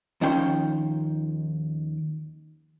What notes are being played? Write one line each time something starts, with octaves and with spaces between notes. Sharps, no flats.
D#2 D#3 F3 C#4 G5 C6